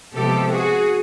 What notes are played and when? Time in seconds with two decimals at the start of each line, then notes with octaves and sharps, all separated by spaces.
0.15 C3 F3 G#3 B3 G4 A4
0.51 F#4 G#4